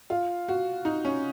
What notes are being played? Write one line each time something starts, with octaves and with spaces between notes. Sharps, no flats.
F4
F#4
D#4
C#4